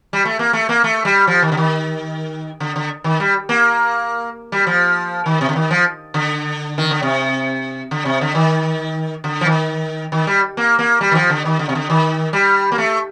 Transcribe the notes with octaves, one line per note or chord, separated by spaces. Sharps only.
G3
A3
A#3
A3
A#3
A3
G3
F3
D#3
D3
D#3
D3
D3
D#3
G3
A#3
G3
F3
D#3
C3
D3
D#3
F3
D3
D#3
D3
C3
D3
C3
D3
D#3
D3
F3
D#3
D#3
G3
A#3
A#3
G3
D#3
F3
D3
D#3
D3
C3
D3
D#3
G3
A#3
A3